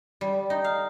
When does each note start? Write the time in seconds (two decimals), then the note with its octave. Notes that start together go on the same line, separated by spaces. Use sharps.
0.21 G3
0.50 D#4
0.64 F5